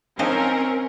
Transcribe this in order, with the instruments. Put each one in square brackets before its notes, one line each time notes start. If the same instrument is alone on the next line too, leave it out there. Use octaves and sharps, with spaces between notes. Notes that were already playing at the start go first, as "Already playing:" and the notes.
[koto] F3 D#4 [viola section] C4 A#4 [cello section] C#4